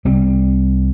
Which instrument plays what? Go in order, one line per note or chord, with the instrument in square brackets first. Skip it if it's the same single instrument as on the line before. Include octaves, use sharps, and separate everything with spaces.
[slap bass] C2 G3 C4